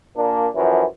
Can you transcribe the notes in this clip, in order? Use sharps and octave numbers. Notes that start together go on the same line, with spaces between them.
A#2 A#3 D4
F#2 E3 F3